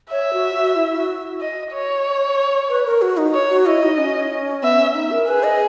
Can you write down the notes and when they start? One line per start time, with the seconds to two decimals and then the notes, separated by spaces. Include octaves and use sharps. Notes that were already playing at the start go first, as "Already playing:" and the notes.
0.11 C#5 E5
0.33 F#4
0.55 F#4
0.76 E4
0.97 F#4
1.41 D#5
1.72 C#5
2.69 B4
2.86 A#4
3.02 F#4
3.17 D#4
3.34 C#5
3.50 F#4
3.66 E4 D#5
3.83 D#4
3.98 C#4
4.63 B3 E5
4.79 C#4
4.95 D#4 E5
5.11 A#4
5.28 G#4 B4
5.43 D#5